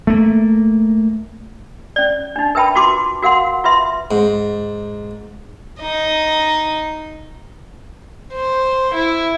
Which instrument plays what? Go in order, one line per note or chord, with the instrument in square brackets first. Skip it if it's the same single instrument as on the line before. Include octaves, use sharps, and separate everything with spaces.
[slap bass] A3 A#3
[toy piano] C#4 D5
D4 D#4
A#4 B4 E5 G5 A5 B5
F4 F#4 A5 C6 D6
F#4 A#4 F5 F#5 C6
F4 B4 E5 C6
[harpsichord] G#2
[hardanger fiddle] D#4 D#5
[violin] C5
E4